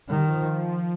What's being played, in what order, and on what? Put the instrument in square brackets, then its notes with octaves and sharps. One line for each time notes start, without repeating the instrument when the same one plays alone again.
[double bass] D#3 [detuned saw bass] G3
[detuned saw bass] F3